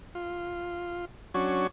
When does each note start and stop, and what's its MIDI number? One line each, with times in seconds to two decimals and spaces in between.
0.15 1.05 65
1.34 1.67 54
1.34 1.67 61
1.34 1.67 62
1.34 1.67 66
1.34 1.67 73